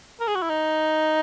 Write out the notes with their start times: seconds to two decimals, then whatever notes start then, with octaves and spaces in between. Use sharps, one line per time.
0.20 A#4
0.28 G#4
0.35 F#4
0.42 E4
0.50 D#4